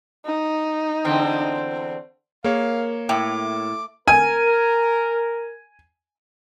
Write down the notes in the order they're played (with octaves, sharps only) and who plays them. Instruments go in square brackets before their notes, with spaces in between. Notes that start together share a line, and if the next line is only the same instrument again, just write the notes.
[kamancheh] D#4
[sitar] E2 D3 C4
[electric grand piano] A#3 C#5 [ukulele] G#4 A#4 [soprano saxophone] F5
[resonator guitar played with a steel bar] A2 [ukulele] G5 [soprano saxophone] D6
[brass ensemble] A#4 [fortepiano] G#5